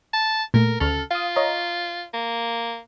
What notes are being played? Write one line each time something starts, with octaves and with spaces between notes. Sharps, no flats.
A5
A#2 A3 A#4
D2 C#3 A4 F6
F4 F5 D#6
C#5 D#5 A#5
A#3